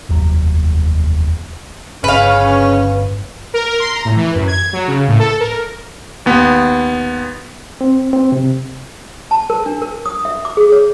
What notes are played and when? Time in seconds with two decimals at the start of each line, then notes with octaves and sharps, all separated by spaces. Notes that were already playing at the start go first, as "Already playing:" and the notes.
0.09 F1 D#2 F#3
2.04 G1 C#3 C#4 B4 F5
3.54 A#4
3.80 C6
3.93 A#5
4.05 A2
4.17 E3
4.36 F#2
4.47 G#6
4.73 F#3
4.88 C#3
5.08 A2
5.19 A4
5.40 A#4
6.26 D#2 B3
7.81 C4
8.13 C4
8.32 C3
9.31 A5
9.50 A#4
9.66 D4
9.82 A#4
10.06 D#6
10.25 E5
10.45 D6
10.57 G#4
10.72 C#5